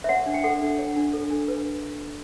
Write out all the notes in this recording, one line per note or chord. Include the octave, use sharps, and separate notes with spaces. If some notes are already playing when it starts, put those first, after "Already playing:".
E5
C#5 F#5
D4
G5
A4 F#5
D4
C#5
D4
A4
D4
B4